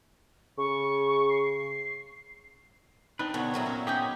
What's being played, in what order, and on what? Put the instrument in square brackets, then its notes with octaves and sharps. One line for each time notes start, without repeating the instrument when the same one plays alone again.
[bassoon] C#3 [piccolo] C#6
[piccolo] C7
[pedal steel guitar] C4 D4 B4 [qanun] D#4
[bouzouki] B2 D3 [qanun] B3 [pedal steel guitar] C4 F#4 C#5
[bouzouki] A#2 F#3 E4
[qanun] C#4
[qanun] C#4 B5 C#6 [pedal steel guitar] G4 G#4 D#5 [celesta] G5 G6